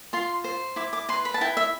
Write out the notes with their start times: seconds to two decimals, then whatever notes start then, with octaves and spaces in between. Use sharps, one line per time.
0.13 F4 C6
0.44 C5
0.76 E4 D6
0.93 D6
1.09 B4 C6
1.25 B5
1.34 A5
1.41 E4 G5
1.57 E5